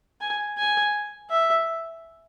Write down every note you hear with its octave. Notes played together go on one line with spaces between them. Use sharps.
G#5
G#5
E5